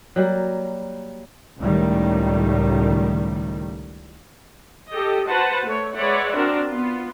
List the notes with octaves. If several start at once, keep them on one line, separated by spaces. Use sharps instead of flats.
F#3 G3 A#3
C#2 A2 D#3 G3
G4 A4 D#5
F#4 B4 C5 F#5 A5
A3 C#5
G#3 B4 C#5 D5 E5 F#5
C4 D4 F#4 A#4
B3 F4